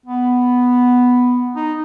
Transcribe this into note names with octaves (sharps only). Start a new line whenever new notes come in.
B3
D#4